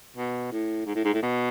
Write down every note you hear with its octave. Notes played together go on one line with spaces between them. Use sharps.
B2
A2
G#2
A2
G#2
A2
B2